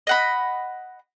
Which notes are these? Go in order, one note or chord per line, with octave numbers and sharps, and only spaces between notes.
D#5 F#5 B5